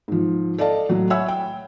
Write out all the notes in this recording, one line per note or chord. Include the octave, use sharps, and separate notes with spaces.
G#2 F3
A4 D5 D#5 F5 A5
A2 F#3 F#4
C#5 E5 F#5 G#5 B5 E6
G5